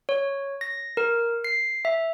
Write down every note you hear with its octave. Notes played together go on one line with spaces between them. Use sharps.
C#5
A#6
A#4
C7
E5